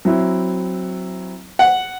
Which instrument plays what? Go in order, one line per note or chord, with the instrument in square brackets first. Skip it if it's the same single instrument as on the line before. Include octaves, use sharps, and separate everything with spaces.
[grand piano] F#3 C4 E4
[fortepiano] F#5